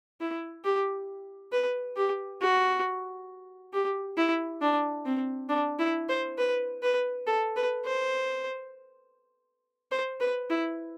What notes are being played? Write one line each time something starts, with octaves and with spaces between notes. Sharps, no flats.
E4
G4
B4
G4
F#4
G4
E4
D4
C4
D4
E4
C5
B4
B4
A4
B4
C5
C5
B4
E4